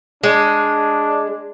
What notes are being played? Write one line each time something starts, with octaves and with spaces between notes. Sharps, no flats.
G#3 D4